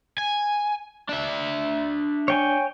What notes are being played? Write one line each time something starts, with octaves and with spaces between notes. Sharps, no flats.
G#5
D4 E5
C#5 G5 G#5